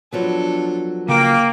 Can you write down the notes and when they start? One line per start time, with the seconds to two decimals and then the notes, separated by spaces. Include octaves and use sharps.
0.12 F3 F#3 B3 D4 A4
1.08 C#3 A#3 A#4 G5 D6